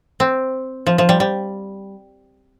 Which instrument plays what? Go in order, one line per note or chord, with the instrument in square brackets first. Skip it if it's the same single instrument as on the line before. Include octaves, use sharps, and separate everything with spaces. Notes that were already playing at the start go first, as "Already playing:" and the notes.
[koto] C4
F3
F3
G3
G3